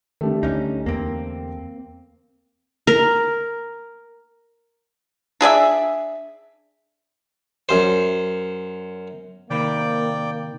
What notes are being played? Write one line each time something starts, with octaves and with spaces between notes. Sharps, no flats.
D3 D#3 G3 A3
D2 C#4 D#4
E2 A#3 C4
A#4
D4 G#4 D5 E5
F#2 C5
C3 D#3 A#3 D5 G5 B5